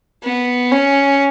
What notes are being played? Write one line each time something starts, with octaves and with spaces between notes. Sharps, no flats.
B3
C#4